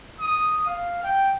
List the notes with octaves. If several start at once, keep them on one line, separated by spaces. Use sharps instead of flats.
D#6
F5
G5